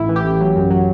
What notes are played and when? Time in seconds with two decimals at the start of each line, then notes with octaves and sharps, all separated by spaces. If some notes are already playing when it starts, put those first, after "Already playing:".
Already playing: A1 A2 E4
0.09 E3
0.16 G4
0.25 A1
0.40 F#3
0.56 F#2
0.71 F#3